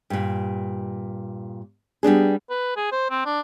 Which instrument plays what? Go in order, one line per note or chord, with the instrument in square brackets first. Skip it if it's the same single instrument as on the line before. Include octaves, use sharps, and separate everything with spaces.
[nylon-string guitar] G2 A#2
G3 B3 D4 G#4
[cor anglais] B4
G#4
C5
C4
D4